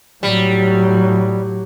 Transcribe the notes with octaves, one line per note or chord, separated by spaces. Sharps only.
A2 F#3 G3